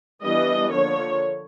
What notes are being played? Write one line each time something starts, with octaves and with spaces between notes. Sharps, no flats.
E3 G3 B3 D4 D#5
D3 F3 A#3 C#5